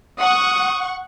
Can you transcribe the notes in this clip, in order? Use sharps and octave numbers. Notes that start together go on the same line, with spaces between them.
F#5 C#6 D#6